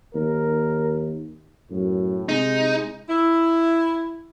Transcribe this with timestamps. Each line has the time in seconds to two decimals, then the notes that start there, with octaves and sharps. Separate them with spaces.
0.15 D#2 A#4
1.71 F#2 A2
2.29 C3 G#3 D#4
3.09 E4